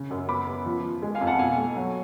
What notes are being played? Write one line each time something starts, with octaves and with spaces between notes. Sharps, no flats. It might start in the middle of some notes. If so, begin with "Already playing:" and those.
Already playing: C#3
F#2
B3 B5 D6
B3
F3
F3
G#3
F5 G#5
F2
F#5 A5
B2 F5 G#5
A3
F#3